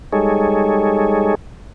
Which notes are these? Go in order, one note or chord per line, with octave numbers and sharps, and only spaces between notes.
G3 G#3 D#4 G#4 A4 C#5